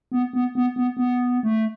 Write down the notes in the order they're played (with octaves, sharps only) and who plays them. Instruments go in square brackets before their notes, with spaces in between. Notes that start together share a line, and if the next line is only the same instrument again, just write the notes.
[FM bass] B3
B3
B3
B3
B3
A3